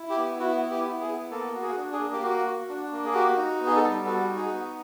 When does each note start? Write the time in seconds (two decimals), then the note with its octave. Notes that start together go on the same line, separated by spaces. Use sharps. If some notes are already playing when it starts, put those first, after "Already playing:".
Already playing: E4
0.09 G4
0.17 B3
0.39 E4 F#4
0.63 B3
0.71 G4
0.86 E4
1.01 G#4
1.08 B3
1.31 A#3 A4
1.54 F#4
1.62 G#4
1.77 D4
1.92 G#4
2.00 A#3
2.12 G4
2.22 A#3 F#4
2.46 F#4
2.69 D4
2.91 A#3
3.05 G#4
3.14 F#4 G4
3.37 D#4
3.60 B3
3.66 G#4
3.75 A4
3.83 G3
4.05 F#4 A4
4.29 D#4
4.36 G#4
4.51 B3